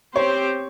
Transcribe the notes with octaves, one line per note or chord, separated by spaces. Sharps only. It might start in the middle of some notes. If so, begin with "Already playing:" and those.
C4 G4 C5 C#5